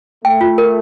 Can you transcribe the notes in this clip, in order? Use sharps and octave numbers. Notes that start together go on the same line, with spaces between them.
A3 G5
F4
A#4